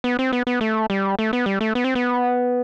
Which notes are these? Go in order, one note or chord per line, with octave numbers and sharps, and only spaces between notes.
B3
C4
B3
B3
A3
G3
A3
B3
G3
A3
B3
C4
B3